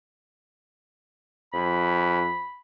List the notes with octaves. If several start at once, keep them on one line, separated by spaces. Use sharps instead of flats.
F2 B5